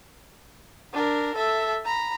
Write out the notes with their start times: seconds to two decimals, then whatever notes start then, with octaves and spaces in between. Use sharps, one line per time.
0.93 D4 A#4
1.35 A4 E5
1.85 A#5 B5